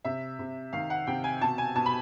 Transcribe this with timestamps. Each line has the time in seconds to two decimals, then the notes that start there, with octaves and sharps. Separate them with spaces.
0.04 C3 E5
0.39 C3
0.73 D#3 F5
0.90 F#5
1.07 C3 G5
1.24 G#5
1.41 B2 A5
1.58 G#5
1.75 B2 A5
1.86 B5